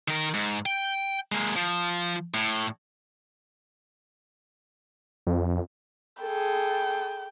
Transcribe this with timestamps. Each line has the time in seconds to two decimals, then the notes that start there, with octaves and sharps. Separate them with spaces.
0.08 D#3 A#4
0.34 G#2
0.66 G5
1.32 G#3 A#3
1.56 F3
2.34 A2
5.27 F2
6.22 G#4 A4 G5